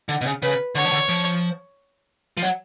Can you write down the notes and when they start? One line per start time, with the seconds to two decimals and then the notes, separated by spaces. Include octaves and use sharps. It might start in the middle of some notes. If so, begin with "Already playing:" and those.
0.09 D3
0.21 B2
0.26 C#3
0.42 C#3 B4
0.75 D3 C#5
0.85 F3
0.93 D3
1.09 F3
2.37 F3
2.42 F#3